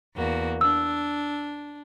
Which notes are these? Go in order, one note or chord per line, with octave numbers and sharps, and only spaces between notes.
E2 A#3 F#4
D4 E6